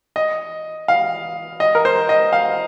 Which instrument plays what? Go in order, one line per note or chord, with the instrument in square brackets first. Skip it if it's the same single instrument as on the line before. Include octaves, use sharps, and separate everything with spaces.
[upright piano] D#5
F5
D#5
A#4
C5
D#5
F5